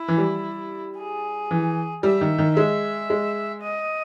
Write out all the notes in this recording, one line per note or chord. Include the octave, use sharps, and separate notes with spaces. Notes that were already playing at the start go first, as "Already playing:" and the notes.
Already playing: E4
E3
G3
G#4
E3
G3 E5
D#3
D#3
G#3 E5
G#3
D#5